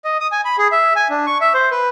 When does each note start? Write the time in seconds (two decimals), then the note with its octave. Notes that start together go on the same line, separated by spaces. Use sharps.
0.05 D#5
0.20 D#6
0.32 G#5
0.45 B5
0.58 G#4
0.72 E5
0.96 G#5
1.10 D4
1.26 C#6
1.41 E5
1.54 C5
1.71 B4